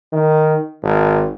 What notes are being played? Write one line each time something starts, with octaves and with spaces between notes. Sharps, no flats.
D#3
G#1